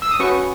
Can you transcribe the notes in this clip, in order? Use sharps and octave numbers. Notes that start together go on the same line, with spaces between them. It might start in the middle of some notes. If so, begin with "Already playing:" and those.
E6
D#6
C#4 F#4 B4 C#6